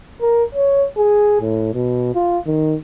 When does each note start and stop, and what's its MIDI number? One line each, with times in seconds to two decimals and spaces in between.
0.22 0.44 70
0.55 0.86 73
0.97 1.39 68
1.41 1.71 45
1.74 2.14 47
2.15 2.39 65
2.46 2.75 51